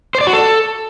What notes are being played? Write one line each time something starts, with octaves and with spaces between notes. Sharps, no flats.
C5
D5
F#4
A4